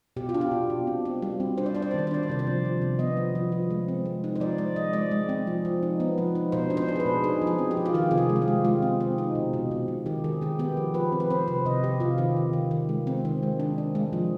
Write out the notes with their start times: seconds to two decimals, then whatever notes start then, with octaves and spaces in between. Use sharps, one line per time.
0.16 B2 G4
0.29 F4
0.34 D4
0.41 G4
0.52 B2
0.70 B2
0.87 C4
1.05 C4
1.22 G3
1.40 C4
1.58 D4 C5
1.66 D5
1.75 D4 C5
1.82 D5
1.91 C5
1.94 D#3 D5
2.07 C5
2.11 D4 D5
2.23 C5
2.29 C3 D5
2.39 C5
2.47 F3
2.65 F3
2.82 C3
2.99 B3 D#5
3.17 F3
3.35 F3
3.52 F3
3.70 G#3
3.88 C4
4.05 G#3
4.24 D#4
4.36 C5
4.40 F3 D5
4.58 G#3 D5
4.76 G#3 D#5
4.93 G#3 D5
5.11 G#3
5.29 C4
5.47 F3
5.65 F3
5.83 D#4
6.00 B3
6.18 F3
6.35 D#4
6.52 B2 C5
6.70 D4
6.77 C5
6.88 D4
6.96 G#4
7.00 B4
7.06 B2
7.24 D#4 G#4
7.42 F3
7.47 G#4
7.59 C4
7.71 G4
7.77 F3
7.86 F4
7.94 D#3 G4
8.11 C3 G#4
8.18 G4
8.29 G#3
8.36 F4
8.42 G4
8.48 G#3
8.65 G#3 F4
8.82 C4
9.00 C4
9.18 D#4
9.35 B2
9.53 B2
9.71 B2
9.88 B2
10.06 D#3 G4
10.24 D#3 G#4
10.41 D#3 G4
10.59 B3 G4
10.77 F3 G#4
10.94 F3 B4
11.12 C4
11.20 B4
11.30 C4 C5
11.48 C3 B4
11.65 C3 D#5
11.83 C3 G4
12.00 C3 F4
12.18 D#3 G4
12.37 D#3
12.53 D#3
12.71 D#3
12.89 G#3
13.07 C4
13.25 D#3
13.43 G#3
13.60 D4
13.78 D4
13.95 G#3
14.13 F3